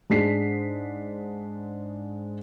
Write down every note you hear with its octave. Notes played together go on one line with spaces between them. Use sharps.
G#2 G#3 D4 G#4 B6 C7